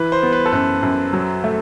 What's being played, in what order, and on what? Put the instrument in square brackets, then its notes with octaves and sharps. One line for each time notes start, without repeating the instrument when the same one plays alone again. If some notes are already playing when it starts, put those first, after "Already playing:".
Already playing: [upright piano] E3 [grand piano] B4
[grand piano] C5
[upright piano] B3
[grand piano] B4
A4
[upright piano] F#2 [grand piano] B4
[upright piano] F#2
F#3
A3